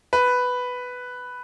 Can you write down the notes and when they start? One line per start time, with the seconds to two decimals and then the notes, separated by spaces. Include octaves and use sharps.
0.13 B4